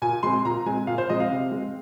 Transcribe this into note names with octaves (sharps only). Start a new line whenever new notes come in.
A#2 G#5
G#3 C4 C6
A#2 A#5
G#3 C4 G#5
A#2 F5
C5
F3 G#3 C4 D#5
F5
C3
G#3 C4